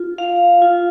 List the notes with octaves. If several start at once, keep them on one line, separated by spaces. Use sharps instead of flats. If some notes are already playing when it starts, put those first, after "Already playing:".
Already playing: F4
F5
F4